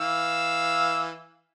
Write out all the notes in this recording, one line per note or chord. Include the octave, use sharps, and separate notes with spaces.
E3 F5 E6